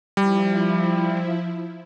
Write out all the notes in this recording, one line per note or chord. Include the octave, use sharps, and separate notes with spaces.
F3 G3 E4